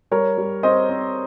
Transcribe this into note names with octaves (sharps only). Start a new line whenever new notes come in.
G3 A#4 C#5
G3
C4 C5 D#5
C4